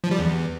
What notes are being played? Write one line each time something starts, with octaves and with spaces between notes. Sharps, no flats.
F3
G3
E2